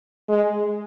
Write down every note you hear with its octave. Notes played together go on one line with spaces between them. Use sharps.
G#3